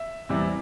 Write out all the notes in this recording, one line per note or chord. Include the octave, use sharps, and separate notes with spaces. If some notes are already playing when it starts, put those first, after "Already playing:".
Already playing: E5
E2 C3 G3 C4 E4